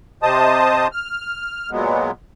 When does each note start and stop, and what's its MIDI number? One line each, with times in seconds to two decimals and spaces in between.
0.23 0.87 48
0.23 0.87 72
0.23 0.87 75
0.23 0.87 81
0.23 0.87 87
0.92 1.70 89
1.71 2.11 46
1.71 2.11 54
1.71 2.11 56
1.71 2.11 59